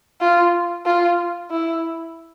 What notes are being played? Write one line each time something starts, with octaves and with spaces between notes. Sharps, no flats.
F4
F4
E4